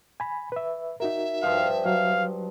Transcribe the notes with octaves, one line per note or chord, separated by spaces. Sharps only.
G#5 B5
B4 E5
D#4 F#4 A#4 E5
G2 F3 F5
F#3 F5